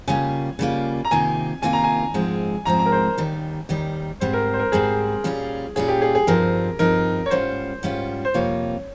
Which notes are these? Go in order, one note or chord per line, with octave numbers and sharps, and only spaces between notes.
C#3 G3 A#3 F4 G#5
C#3 G3 A#3 F4
A#5
C3 D#3 A#3 F4 G#5
C3 D#3 A#3 F4 G#5
A#5
G#5
G#2 F3 G#3 C4
G#2 F3 G#3 C4 A#5
A#5
A#4
C5
D#2 D#3 G3
D#2 D#3 G3
G#2 G3 C4 C5
A#4
C5
A#4
G#2 G3 C4 G#4
A#2 G3 C#4 F4
A#2 G3 C#4 F4 G#4
G4
G#4
G#4
G2 F3 C4 D#4 A#4
G2 F3 C4 D#4 A#4
C#5
G#2 G3 C#4 F4 C5
G#2 G3 C#4 F4
C5
F2 C3 G3 A#3 F4 C#5